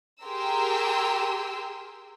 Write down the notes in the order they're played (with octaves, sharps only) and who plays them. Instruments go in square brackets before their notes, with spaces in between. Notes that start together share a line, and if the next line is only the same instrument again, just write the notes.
[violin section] G4 G#4 A#4 C6 E6